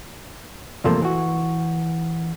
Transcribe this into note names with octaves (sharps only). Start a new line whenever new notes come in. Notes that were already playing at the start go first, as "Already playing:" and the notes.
E2 G2 C3 F3 A3 A#3
E3 F#4